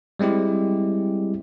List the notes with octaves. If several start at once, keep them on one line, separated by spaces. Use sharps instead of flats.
G3 G#3 C4 E4 G4